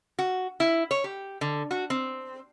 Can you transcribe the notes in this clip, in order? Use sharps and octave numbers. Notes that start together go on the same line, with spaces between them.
F#4
E4
C#5
G4
D3
F#4
C4